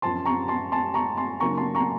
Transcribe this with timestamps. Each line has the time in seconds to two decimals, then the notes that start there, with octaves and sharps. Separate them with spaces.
0.02 F#2 F3 C4 A5 C6
0.25 A#5 C#6
0.48 A5 C6
0.72 A5 C6
0.94 A#5 C#6
1.17 A5 C6
1.40 C#3 F#3 A#3 D#4 A#5 C#6
1.57 A5 C6
1.75 A#5 C#6